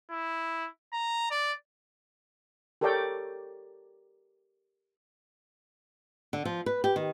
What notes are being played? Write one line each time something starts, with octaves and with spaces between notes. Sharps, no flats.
E4
A#5
D5
G4 A4 A#4 C#5 D5 G5
D3
F3
B4
G4
D#3